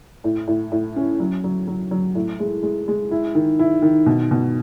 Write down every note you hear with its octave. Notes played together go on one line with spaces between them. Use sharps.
A2
A2
A2
C#4
F#3
F#3
F#3
F#3
A2
G#3
G#3
G#3
E4
D#3
E4
D#3
B2
B2